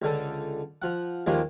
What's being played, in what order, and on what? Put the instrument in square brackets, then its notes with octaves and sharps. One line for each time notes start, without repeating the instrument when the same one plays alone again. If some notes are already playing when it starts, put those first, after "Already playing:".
[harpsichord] C#2 D3 A4
F3 F#5
D#2 F3 G#3 A#3 G4 D#5